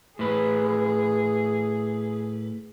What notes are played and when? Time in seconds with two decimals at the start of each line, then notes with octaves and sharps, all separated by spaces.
0.19 A2 G#4 B4